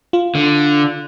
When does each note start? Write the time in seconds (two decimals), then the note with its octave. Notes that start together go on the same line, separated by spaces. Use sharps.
0.13 F4
0.35 D3